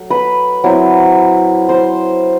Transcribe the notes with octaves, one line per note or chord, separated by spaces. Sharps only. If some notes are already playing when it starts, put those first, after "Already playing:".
Already playing: F#3 A3
B4 B5
F#3 C4 E4
C5 C6